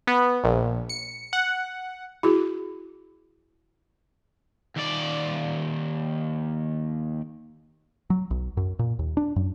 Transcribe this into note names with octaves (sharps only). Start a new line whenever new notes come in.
B3
A#1
C#7
F#5
E4 F#4 G#4
D#2 D5
F#3
B1
F#2
A#2
D#2
D4
F#2